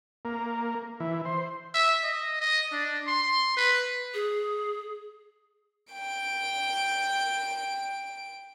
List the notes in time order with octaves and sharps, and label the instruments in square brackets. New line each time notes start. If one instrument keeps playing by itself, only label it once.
[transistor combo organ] A#3
E3
C5
[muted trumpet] E5
D#5
D#5
D4
C6
B4
[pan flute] G#4
[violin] G5 D7